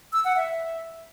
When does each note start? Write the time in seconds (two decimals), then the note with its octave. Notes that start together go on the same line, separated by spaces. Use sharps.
0.13 E6
0.25 F#5
0.36 E5